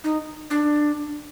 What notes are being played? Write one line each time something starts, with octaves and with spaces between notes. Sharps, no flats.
D#4
D4